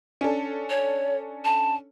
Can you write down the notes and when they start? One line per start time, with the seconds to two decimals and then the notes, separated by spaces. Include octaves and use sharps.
0.21 C#4 D4 A4
0.70 C#5
1.45 A5